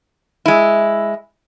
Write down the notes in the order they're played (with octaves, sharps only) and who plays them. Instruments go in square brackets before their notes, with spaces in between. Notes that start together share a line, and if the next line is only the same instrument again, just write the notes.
[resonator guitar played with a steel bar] G#3 E4